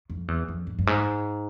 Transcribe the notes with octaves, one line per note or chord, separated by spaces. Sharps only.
F2
E2
F2
G#2
G2
G#2